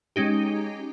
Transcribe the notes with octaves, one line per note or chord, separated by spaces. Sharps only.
G#3 C#4 D#4 G4